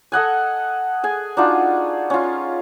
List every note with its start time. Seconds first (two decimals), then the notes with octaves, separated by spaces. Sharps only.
0.12 A4 D#5 F#5 G#5
1.04 G#4 G#5
1.37 D4 D#4 F4 F#4
2.10 C#4 F4